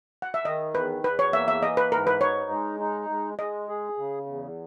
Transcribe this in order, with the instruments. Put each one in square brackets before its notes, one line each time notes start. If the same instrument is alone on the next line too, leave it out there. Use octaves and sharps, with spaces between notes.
[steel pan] F#5
E5
[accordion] D#3 [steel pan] D#5
[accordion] E2 [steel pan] B4
[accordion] E2 [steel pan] B4
[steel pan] C#5
[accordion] A#3 [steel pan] E5
[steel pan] E5
[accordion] E3 [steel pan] D#5
[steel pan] B4
[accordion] G#2 [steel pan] A#4
[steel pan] B4
[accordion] D#4 [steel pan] C#5
[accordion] G#3
D#4
G#3
[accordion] G#3 [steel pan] D#5
[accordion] G#4
C#3
E2